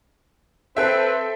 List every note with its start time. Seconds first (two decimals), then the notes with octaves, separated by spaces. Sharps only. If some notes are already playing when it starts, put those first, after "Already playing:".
0.77 C4 A4 B4 C5 E5